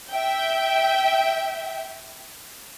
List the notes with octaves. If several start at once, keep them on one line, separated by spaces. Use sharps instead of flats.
E5 G5